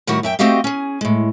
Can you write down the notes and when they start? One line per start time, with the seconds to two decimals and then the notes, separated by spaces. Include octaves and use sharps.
0.07 A2 D#3 G3 F#4 F#5
0.23 F#2 E5 G5
0.39 A3 C4 F#4 G4 D#5 F5
0.64 C#4 G#4
1.01 A2 G#3